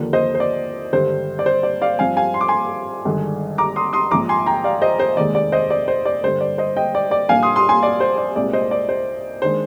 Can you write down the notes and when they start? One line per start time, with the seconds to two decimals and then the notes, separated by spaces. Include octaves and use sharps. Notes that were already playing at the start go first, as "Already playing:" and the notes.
Already playing: D#2 D3 F3 A#3
0.13 C5 D#5
0.35 C5
0.40 D5
0.93 G#1 G2 D3 G3 C5
1.39 D5
1.46 C5
1.63 D5
1.82 D5 F5
1.99 G2 F3 C4 F5 G#5
2.17 F5 G#5
2.34 C6
2.41 D6
2.48 G#5 C6
3.05 G#1 G2 D3 G#3
3.58 A#5 D6
3.76 C6 D#6
3.93 C6 D#6
4.11 A#1 G#2 F3 A#5 D6
4.29 G#5 C6
4.46 G5 A#5
4.64 D5 F5
4.81 C5 D#5
4.99 C5
5.17 F1 D#2 D#3 G#3 D5
5.35 D5
5.52 C5 D#5
5.70 D5
5.88 C5
6.05 D5
6.23 G2 D3 G3 C5
6.40 D5
6.58 C5 D#5
6.76 D#5 G5
6.95 D5
7.11 D5
7.29 A#1 A#2 G3 D4 F5 G#5
7.43 C6 D#6
7.56 C6 D#6
7.69 G#5 C6
7.83 D5
8.00 C5
8.18 D5
8.36 C2 A#2 G#3 C4 D5
8.53 C5 D#5
8.71 D5
8.89 C5
9.42 D#3 G#3 D4 C5